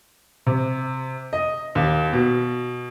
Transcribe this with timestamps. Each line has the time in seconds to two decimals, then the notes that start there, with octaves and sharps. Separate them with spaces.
0.46 C3
1.33 D#5
1.75 D#2
2.13 B2